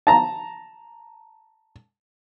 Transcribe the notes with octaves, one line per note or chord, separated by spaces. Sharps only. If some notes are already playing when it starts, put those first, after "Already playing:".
A5 A#5